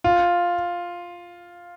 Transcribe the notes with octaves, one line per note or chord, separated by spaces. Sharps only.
F4